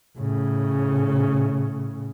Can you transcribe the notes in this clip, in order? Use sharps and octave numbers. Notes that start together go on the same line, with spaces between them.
A2 C#3